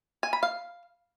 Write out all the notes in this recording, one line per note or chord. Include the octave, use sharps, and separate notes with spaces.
G#5
B5
F5